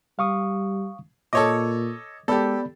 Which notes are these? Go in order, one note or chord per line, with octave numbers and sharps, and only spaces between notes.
G3 F5 C#6 D#6
A#2 A4 C#5 D#5 D6
G#3 B3 G4 A4 D5 B5